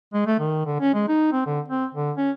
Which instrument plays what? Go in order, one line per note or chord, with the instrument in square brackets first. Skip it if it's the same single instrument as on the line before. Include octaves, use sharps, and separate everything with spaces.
[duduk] G#3
A3
D#3
D3
C#4
G#3
D#4
C4
D3
C4
D3
C#4